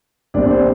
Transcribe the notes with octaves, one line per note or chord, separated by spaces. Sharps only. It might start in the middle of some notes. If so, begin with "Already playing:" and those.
A#1 A#2 G3 C4 D4 D5
C4 C5